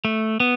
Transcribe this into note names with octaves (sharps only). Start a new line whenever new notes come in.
A3
B3